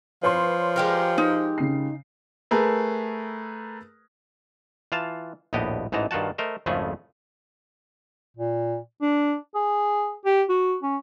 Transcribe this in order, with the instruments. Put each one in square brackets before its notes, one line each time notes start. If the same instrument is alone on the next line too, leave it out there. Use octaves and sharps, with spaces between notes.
[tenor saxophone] F3 [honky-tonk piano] B4 C#5 C6
[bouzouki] G#3 G4 A#4
[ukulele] D#4
[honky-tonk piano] C#3 C7
[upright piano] A3 G#4 A#4 B4
[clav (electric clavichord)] E3 F4 F5 A5
A#1 D#2 A2 B3 G4 D#5
A1 G#2 E3 D#4 A5 A#5
G2 D#3 F4 F#4 A5
A3 A#4 C5 D#5
G#1 F2 C#3 F3 A3 G#4
[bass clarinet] A#2
D4
G#4
G4
F#4
C#4